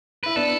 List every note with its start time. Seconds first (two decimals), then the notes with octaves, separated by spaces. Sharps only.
0.24 E4 B4
0.36 B3 D4 A4